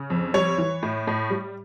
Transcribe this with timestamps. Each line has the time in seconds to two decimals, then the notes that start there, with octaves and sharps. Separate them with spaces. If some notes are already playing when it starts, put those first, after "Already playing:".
Already playing: C#3
0.10 F2
0.34 G3 C#5
0.58 E3
0.83 A2
1.07 A2
1.30 G3